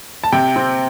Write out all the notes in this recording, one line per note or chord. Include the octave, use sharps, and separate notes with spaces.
A5
C3 G5
C4